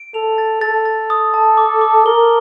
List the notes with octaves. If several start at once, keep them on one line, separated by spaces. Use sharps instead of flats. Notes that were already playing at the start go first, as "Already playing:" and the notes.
Already playing: D7
A4 F7
A6
A4 A6
A6
D#6
A5
D6
D6
A#4 G7